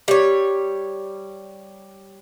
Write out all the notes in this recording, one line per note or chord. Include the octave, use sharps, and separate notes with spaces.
G3 C#5